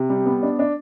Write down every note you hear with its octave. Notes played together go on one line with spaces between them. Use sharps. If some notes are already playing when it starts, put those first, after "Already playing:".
Already playing: C3
G3
B3
D4
D4